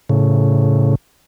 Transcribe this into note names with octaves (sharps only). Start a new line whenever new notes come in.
A2 C#3